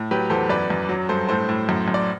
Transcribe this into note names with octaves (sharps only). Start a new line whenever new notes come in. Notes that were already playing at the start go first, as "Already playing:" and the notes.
Already playing: A2
F#3 G4 B4
E2 A4 C5
F#2 B4 D5
F#2
F#3
G2 A4 C5
A2 A4 C5
A2
F#2
F#2
D5